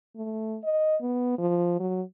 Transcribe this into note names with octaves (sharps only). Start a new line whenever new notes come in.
A3
D#5
B3
F3
F#3